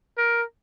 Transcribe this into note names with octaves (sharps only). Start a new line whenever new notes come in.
A#4